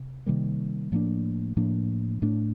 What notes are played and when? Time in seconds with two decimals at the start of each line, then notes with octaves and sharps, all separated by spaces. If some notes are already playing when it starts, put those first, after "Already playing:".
Already playing: C3
0.26 C3 D#3 G3 A#3
0.92 A2 F3 A#3 D4
1.57 A2 F3 A#3 D4
2.22 A2 A3 D4